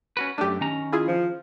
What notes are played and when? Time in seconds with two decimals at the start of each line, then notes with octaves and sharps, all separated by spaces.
0.17 C#4 F#4 B4
0.38 F#2 A3 D4 G4
0.61 D#3 C#4 A#5
0.92 E4 F4 G#4
1.08 F3